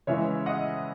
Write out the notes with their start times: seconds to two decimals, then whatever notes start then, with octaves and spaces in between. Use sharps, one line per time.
0.07 C#3 E3 G#3 C#5 E5
0.46 D#5 F#5